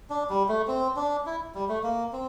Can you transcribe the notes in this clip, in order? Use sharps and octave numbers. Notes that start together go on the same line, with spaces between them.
D4
G3
A3
C4
D4
E4
G3
A3
A#3
C4